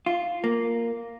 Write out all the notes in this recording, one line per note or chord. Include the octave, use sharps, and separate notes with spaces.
F4
A#3